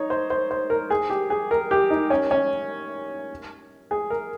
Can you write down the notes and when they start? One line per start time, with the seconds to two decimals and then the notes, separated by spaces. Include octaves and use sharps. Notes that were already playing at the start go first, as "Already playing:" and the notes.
Already playing: D#4 C#5
0.10 C5
0.30 C5
0.51 C5
0.70 A#4
0.90 G#4
1.10 G4
1.30 G#4
1.51 A#4
1.71 G4
1.90 D#4
2.10 C#4
2.31 C#4
3.91 G#4
4.10 A#4